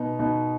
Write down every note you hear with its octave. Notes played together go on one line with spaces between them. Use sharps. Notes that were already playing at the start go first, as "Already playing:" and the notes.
Already playing: B2 B3 D#4
B2 B3 D#4